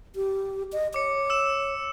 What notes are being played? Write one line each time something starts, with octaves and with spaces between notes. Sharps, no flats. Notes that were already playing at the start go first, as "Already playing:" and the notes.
G4
D#5
C#5 D6 C#7
E6 E7